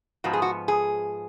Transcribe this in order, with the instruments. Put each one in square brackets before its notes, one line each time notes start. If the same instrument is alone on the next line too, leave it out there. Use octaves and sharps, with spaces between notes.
[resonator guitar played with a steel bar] G#2 F3 B3 F#4
G#4
F#4
G#4